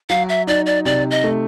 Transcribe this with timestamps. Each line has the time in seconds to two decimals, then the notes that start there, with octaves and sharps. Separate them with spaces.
0.10 F#3 F5
0.29 E5
0.47 D#4 D5
0.66 D5
0.85 C3 D5
1.11 D#5
1.24 A3